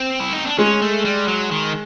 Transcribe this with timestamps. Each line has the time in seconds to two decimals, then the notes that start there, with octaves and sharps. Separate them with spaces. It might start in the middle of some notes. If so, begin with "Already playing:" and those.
Already playing: C4
0.20 E4
0.33 D#4
0.46 D4
0.58 G#3 C#4
0.82 A3
1.05 G3
1.28 F#3
1.51 D#3